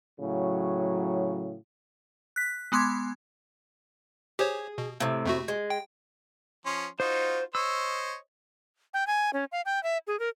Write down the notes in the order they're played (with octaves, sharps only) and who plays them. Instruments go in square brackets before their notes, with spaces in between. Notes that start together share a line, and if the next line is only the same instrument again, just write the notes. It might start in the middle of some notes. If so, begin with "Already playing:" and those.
[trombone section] A2 C#3 F#3
[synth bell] F#6 B6
G#3 B3 C6 D6 G#6
[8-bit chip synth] G4 C5 C#5 [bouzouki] G#4
[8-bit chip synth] B2
[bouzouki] A2 C3
[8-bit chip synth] F2 A3 F#4
[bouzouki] G#3
[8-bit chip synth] G5
[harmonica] F3 C#4 C6
[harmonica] D#4 F4 F#4 [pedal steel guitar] C5
[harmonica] C5 C#5 D#5 [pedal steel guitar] E6
[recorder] G5
G#5
C#4
F5
G5
E5
G#4
A#4